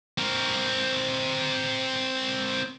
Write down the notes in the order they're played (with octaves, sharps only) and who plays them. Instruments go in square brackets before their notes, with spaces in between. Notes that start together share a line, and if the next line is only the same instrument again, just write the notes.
[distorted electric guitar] C4 A#4